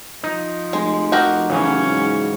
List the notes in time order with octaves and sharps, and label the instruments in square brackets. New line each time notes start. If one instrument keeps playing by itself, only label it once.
[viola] F3 [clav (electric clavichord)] D#4
[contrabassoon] F1 [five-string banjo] G#3
[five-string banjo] F#4 G4 A#4 [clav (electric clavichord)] D#5
[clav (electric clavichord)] C#3 E3 F#3 [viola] C#4
[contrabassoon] G#2